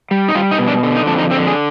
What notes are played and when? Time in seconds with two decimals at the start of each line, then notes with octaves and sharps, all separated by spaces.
0.11 G3
0.28 D#4
0.35 G3 F4
0.51 D#4
0.59 B2
0.68 D4
0.83 D3
0.96 D#4
1.06 F2 D4
1.18 D#4
1.31 D3 C4
1.47 G#4